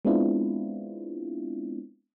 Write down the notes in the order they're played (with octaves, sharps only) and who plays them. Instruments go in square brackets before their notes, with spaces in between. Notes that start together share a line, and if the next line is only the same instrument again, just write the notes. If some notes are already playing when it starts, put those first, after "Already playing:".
[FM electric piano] G#3 B3 C4 D4 E4 F4